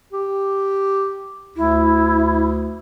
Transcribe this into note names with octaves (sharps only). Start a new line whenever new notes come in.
G4
D2 E4